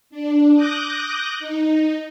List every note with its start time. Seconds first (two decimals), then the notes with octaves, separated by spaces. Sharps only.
0.10 D4
0.53 D6 D#6 F#6 G6 A#6
1.39 D#4